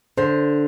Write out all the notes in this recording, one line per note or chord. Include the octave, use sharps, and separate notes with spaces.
D3 C5